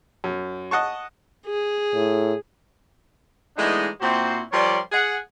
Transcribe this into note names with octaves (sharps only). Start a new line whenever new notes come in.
F#2
D#5 F#5 A5 C#6
G#4
A2
E3 G#3 A3 B3 D4 D#4
A#2 C4 E4 F#4 C5
F3 G3 A#4 C#5 D5 C6
G#4 F#5